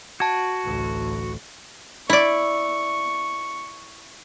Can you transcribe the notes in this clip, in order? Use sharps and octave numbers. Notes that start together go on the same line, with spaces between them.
F#4 A5 G#6
A1 D2
E4 D5 C#6